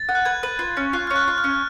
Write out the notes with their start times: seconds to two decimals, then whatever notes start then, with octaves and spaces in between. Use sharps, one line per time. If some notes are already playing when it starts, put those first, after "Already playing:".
Already playing: A6
0.09 F#5
0.15 F#6
0.25 B4 G#6
0.43 B4
0.59 F4
0.77 C#4
0.93 F4 F#6
1.07 C#4 F6
1.16 F#6
1.28 F4
1.38 F6
1.44 C#4